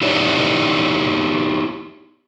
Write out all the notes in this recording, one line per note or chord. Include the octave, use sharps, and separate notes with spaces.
D#4 E4 G4 C#5 D5